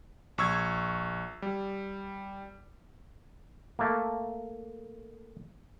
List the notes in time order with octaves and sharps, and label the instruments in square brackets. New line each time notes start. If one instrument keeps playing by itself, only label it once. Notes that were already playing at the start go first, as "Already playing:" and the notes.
[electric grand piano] A#1 C#6 E6 G#6
G3
[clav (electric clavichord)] A3 A#3